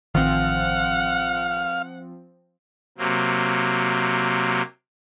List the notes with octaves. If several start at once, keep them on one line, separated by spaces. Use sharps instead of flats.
A1 D#3 F3 C4 F5 F#5
C3 F#3 A#3